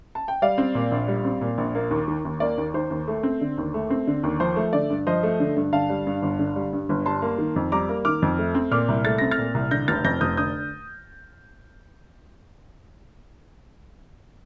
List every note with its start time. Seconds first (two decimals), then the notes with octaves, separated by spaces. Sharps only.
0.15 A5
0.28 G5
0.42 G3 D5 F5
0.58 C4
0.75 A#2
0.92 A#1
1.08 G3
1.25 C4
1.41 A#2
1.58 A#1
1.75 A#3
1.91 D#2
2.08 D#3
2.25 D#2
2.40 A#3 D5
2.58 D#2
2.74 D#3 C5
2.90 D#2
3.08 A3
3.23 C4
3.41 D3
3.58 D#2
3.74 A3
3.90 C4
4.07 D3
4.23 D#2
4.40 F3 C5
4.56 A3
4.73 D3 D5
4.90 G2
5.07 F3 C5 D#5
5.23 A3
5.40 D3
5.56 G2
5.73 D3 F5 A5
5.90 G3
6.07 G2
6.22 G1
6.39 D3
6.56 G3
6.73 G2
6.89 G1
7.06 G3 A5 C6
7.22 A#3
7.38 D#3
7.56 F2
7.72 G3 A#5 D6
7.89 A#3
8.05 D#3 D6 F6
8.22 F2
8.38 A3
8.55 C4
8.71 A#2 D6 F6
8.88 C2
9.05 A3 A6
9.18 C4 A#6
9.31 F6 A6
9.38 A#2
9.54 C2
9.71 D3 G6 A#6
9.88 F1 F6 A6
10.04 F2 G6 A#6
10.21 F1 D#6 G6
10.37 D3 D#6 G6